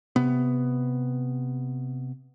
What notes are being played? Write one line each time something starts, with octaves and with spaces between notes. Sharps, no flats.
C3 B3